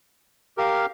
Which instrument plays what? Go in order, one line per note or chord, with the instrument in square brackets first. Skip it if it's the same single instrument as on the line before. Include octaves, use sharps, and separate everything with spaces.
[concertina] G4 A#4 F5